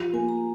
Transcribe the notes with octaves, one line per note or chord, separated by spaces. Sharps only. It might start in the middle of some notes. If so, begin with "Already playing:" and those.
Already playing: F3 F4 G4
A#3 G#5
A#5